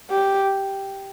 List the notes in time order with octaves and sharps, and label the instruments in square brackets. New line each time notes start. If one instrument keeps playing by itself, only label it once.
[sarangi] G4